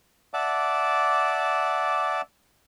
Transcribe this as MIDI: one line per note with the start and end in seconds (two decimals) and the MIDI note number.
0.34 2.21 74
0.34 2.21 76
0.34 2.21 78
0.34 2.21 81
0.34 2.21 86